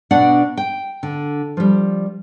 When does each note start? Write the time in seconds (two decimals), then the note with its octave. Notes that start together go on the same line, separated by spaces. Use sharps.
0.11 B2 D4 D5 F#5
0.58 G5
1.03 D3
1.57 F3 G3